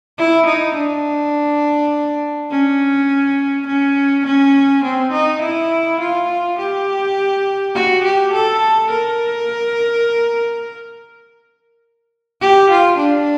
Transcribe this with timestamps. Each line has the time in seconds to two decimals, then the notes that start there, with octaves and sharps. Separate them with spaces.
0.18 E4
0.46 D#4
0.75 D4
2.51 C#4
3.67 C#4
4.26 C#4
4.84 C4
5.12 D#4
5.41 E4
6.00 F4
6.59 G4
7.75 F#4
8.04 G4
8.33 A4
8.91 A#4
12.41 G4
12.70 F4
12.98 D4